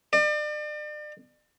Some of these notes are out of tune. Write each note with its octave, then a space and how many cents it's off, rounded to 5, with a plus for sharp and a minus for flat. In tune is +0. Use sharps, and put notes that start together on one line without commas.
D5 +40